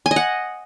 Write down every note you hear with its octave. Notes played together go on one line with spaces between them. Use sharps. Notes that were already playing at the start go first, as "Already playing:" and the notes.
G#5
D#5
F#5